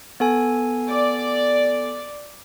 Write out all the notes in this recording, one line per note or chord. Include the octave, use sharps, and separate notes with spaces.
B3 A4 G#5
D5